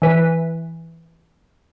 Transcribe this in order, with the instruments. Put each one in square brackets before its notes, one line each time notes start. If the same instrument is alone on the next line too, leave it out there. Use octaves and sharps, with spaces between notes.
[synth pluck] E3 B4